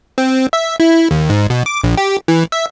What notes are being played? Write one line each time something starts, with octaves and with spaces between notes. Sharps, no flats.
C4
E5
E4
D#2
G#2
B2
D6
A#1
G4
E3
E5